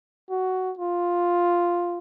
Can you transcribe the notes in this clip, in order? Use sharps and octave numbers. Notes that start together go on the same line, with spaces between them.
F#4
F4